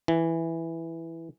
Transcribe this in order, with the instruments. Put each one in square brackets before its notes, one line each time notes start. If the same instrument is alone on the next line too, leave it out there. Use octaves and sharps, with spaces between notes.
[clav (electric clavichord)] E3